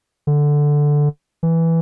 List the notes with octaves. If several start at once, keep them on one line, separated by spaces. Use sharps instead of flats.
D3
E3